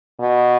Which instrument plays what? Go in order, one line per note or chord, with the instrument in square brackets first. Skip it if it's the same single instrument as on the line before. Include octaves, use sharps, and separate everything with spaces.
[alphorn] B2